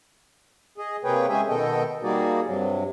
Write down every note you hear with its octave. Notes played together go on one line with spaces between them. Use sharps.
G#4 D#5
C3 A#3 G#4 B4 C#5 G5
G#3 C#4 G#4 E5 G5 G#5
B2 D#3 B3 A4 D#5 G5
G3 A#3 D#4 F#4 G#4 D5
G2 C3 F#3